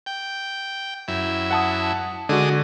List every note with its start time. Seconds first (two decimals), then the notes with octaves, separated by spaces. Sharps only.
0.06 G5
1.08 F#2 E4
1.51 F#5 A5 D#6
2.29 D3 G#3 D4 F#4 D#5